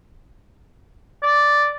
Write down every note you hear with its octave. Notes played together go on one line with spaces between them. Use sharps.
D5